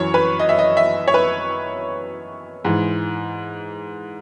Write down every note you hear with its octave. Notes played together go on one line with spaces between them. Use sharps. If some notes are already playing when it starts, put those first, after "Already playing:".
Already playing: F#2 E3 C#5
B4
D#5
E5
D#5
E5
C#5
B4
G#2 E3